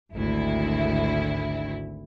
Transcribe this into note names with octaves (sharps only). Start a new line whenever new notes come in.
G#1 D2 E4